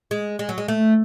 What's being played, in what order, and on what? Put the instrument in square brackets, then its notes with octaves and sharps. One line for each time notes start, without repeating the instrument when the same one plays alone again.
[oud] G#3
G#3
F#3
G#3
A3